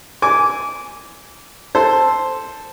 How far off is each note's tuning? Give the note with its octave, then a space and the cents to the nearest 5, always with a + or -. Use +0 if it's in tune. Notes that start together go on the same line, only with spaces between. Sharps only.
G#5 +0 D6 -20
A4 +0 C5 +0